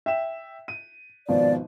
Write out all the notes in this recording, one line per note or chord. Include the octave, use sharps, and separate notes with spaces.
E5 G5 E7
D#7
G#1 B2 F3 D5